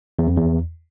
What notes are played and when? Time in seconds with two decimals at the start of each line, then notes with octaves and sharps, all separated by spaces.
0.19 E2
0.27 F2
0.36 E2